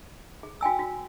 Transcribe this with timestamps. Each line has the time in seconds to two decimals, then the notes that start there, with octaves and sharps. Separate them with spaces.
0.43 G#4
0.61 F#4 G5 G#5 E6
0.79 F#4